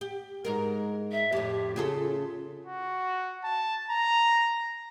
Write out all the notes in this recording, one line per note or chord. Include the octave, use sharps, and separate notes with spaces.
G4
G#2 G#3 A#4
E5
F2 A2 G4
C#3 F4 G#4 A4
F#4
A5
A#5